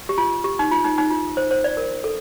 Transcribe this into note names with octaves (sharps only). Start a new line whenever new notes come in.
G4
F4
G4
D#4
F4
D#4
D#4
F4
C5
C5
D5
A#4
A4